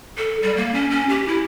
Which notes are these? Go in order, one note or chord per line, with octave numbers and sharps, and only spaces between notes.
A4
G3
A#3
C#4
C#4
G4
E4